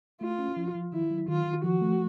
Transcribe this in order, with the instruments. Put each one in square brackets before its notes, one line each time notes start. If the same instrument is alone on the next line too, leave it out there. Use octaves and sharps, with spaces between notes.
[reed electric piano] A3 [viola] F4
[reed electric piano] C#4
F3
F3
[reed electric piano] D#3 [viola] E4
[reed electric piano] F#3
[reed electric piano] D#3 [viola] F4
[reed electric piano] D#3
[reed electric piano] F3 [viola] F#4
[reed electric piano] A3